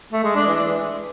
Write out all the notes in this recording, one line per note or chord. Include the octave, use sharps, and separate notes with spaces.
A3
G#3
D4
E3